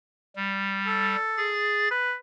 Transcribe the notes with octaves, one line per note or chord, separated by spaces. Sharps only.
G3
A4
G#4 A6
B4